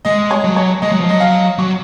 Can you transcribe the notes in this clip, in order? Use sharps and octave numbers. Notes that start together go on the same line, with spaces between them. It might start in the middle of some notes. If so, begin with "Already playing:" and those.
G#3 D#5
C#5
F#3
C#5
G#3 D#5
F#3
F3
F#3 D#5
F5
F#3 C#6